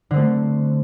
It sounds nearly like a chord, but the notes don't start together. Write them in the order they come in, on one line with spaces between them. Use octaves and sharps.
D3 C4 A3